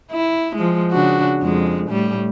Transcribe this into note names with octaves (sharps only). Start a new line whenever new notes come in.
E4
F3 G#3
C#3 D4 F#4
F2 G#3
A2 G3